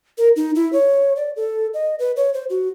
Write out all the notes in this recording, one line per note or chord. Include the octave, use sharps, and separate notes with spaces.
A#4
D#4
E4
C#5
D5
A4
D#5
B4
C#5
C5
F#4